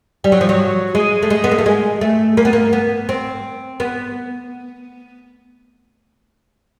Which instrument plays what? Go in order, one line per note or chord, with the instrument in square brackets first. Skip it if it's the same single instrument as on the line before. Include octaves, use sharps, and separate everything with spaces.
[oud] G3
F#3
F3
F#3
G#3
A3
G#3
B3
A#3
A3
G#3
A3
A#3
B3
A#3
B3
C4
B3